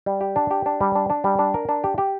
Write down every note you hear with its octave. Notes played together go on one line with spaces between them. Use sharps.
G3
G4
D4
G4
D4
G3
D4
D4
G3
D4
A#4
D4
G4
G4